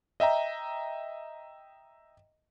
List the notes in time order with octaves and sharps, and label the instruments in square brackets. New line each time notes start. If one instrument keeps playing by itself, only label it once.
[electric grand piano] D#5 E5 G5 A#5